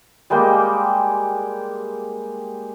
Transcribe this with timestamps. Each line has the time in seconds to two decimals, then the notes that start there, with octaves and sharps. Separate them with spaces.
0.30 G3 G#3 A#3 G5